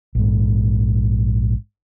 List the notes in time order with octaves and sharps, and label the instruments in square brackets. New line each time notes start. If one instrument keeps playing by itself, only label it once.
[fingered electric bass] A#1 G#2